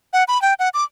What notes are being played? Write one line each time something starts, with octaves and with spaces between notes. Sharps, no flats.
F#5
B5
G5
F#5
D6